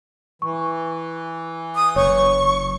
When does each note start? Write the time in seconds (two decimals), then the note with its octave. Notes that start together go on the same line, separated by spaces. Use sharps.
0.42 E3 C#6
1.76 D#6
1.96 F#1 C#5 C#6